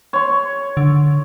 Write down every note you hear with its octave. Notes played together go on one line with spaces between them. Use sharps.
C#5 C6
D3